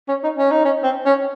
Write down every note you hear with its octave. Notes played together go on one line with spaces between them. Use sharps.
C#4
D#4
C#4
D#4
C#4
C4
C#4